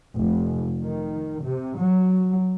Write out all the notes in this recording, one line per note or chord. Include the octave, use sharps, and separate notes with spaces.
F1
D#3
C3
F#3